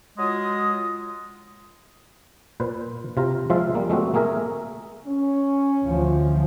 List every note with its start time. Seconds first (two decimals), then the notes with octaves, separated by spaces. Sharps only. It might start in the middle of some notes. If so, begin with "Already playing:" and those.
0.18 F#3 G#3 F4 D#5 D#6
2.60 A#2 B4 C5
3.17 C3 F4 A#5
3.50 F3 G#3 F4 E5 F5
3.75 G3 A#3
3.89 G#3 A3 C4 F#4
4.14 A3 A#3 G#4 A#4 E5
5.07 C#4
5.85 D2 F3